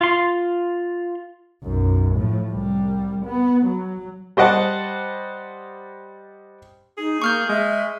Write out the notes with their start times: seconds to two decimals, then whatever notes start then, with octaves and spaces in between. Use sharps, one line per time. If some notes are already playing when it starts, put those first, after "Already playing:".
0.01 F4 C6
1.64 B1 F#2
2.15 A2 F3
2.51 C2 G3
3.26 B3
3.66 F#3
4.37 G3 C5 D#5 F#5 A5
6.97 D#4 G#4
7.22 A#3 C#6 F6 G6
7.49 G#3 E5